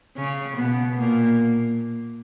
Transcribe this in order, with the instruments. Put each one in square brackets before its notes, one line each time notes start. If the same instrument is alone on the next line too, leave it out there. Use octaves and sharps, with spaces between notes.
[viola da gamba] C#3 C#4
B2 B3
A#2 A#3